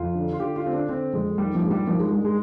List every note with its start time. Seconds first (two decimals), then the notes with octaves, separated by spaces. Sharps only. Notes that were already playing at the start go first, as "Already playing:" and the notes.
Already playing: F2 F4
0.15 D3
0.33 F4
0.40 D3 G4
0.56 F4
0.64 D3 C4
0.73 D4
0.89 D3 C4
1.13 F2 G#3
1.38 D#3 G3
1.55 F3
1.63 G2 G#3
1.71 G3
1.87 D#3 F3
1.99 G#3
2.12 G2 G#3
2.24 G#3